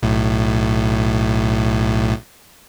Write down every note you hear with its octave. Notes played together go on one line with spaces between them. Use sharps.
B1 A2